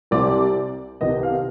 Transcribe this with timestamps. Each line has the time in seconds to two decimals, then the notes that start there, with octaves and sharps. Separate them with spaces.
0.11 C2 C3 G3 C4 D5
1.01 C2 C3 D#3 B3 D#5
1.23 F5